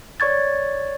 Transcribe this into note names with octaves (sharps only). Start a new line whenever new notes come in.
C#5 D5 C#6 G#6 A6